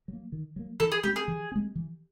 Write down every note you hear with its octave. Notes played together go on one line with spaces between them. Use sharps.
F#3
A#3
D#3
F#3 A#3
E3 A4
G#4
G#3 C4 G4
G#4
E3
G#3 C4
E3